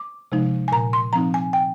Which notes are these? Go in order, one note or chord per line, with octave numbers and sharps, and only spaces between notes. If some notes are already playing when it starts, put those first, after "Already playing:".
Already playing: D6
C3 F3 G#3 D#4
G#5
A#2 A#5
C6
F3 C4 D#4 A#5
G#5
G5